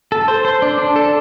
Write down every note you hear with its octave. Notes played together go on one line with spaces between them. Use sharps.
A4
C5
C5
D4
D4
A4